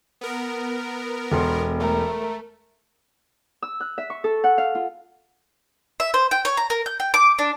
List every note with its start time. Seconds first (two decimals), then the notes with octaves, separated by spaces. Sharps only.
0.21 B3 A#4
1.32 E1 A4 C6
1.80 A3 A#4
3.62 E6
3.80 F#6
3.98 E5
4.10 C#6
4.24 A4
4.44 F#5
4.58 F5
4.75 F4
6.00 E5
6.14 C5
6.31 G5
6.45 C#5
6.57 A#5
6.70 A#4
6.86 G6
7.00 G5
7.14 D6
7.39 D4